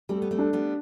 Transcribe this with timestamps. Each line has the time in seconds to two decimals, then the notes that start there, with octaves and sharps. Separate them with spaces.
0.09 G3 A3 C4
0.22 B3
0.31 A3 C4
0.39 D4
0.53 G3 B3